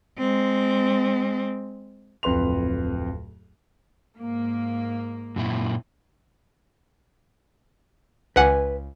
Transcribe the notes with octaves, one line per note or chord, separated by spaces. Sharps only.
G#3 C4
D1 F2 B4 C6 F7
G#2 A#3
F#2 A#2 E4
C#2 B4 F#5 G#5